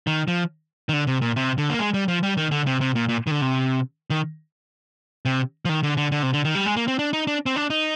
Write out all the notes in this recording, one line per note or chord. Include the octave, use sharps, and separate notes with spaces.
D#3
F3
D#3
D3
C3
A#2
C3
D3
A#3
G#3
G3
F3
G3
D#3
D3
C3
C3
A#2
A#2
D#3
D3
C3
D#3
C3
F3
D#3
D3
D3
D3
C3
D3
D#3
G3
G#3
A#3
C4
D4
D#4
D4
C4
D4
D#4